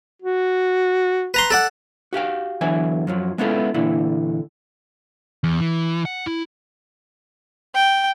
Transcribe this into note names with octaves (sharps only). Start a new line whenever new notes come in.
F#4
B4 A#5 C6
A4 D5 F#5
F#4 G4 F5 G5
E2 D3 E3 F#3 E5 G#5
F#2 F3 F#3
G#3 B3 C#4 E4 F4 A4
A#2 D3 E3 E4
E2
E3
F#5
E4
G5